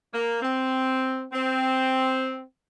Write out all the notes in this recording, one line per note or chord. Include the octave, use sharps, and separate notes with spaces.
A#3
C4
C4